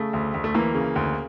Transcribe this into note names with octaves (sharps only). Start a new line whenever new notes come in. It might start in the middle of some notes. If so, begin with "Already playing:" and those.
Already playing: C#3 A3
D2
D2
A3
E3 A#3
C#3
D2